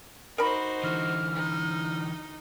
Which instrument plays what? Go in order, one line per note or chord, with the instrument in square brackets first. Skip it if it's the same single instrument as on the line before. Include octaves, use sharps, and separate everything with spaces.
[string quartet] D#4 F#4 C5 [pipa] A#4 B5
[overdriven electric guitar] D3 E3 [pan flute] F6
[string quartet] D#4